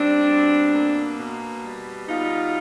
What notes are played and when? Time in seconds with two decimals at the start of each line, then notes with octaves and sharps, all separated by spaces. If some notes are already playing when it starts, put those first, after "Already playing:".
Already playing: G3 C4 D4
0.28 B2
0.74 A#3
1.18 B2
1.64 G3
2.08 B2 D#4 F4